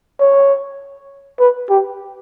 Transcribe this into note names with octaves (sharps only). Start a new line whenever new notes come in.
C#5
B4
G4